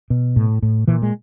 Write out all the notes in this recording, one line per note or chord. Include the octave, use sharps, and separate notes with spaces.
B2
A2
A2
A#2 E3
G#3